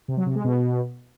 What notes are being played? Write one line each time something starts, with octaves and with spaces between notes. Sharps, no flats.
C3
F#3
C3
G#3
B2